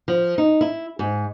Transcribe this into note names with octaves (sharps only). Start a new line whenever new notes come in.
F3
D#4
E4
G#2